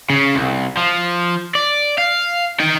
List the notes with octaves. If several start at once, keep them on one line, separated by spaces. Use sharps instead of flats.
C#3
C2
F3
D5
F5
D#4 G5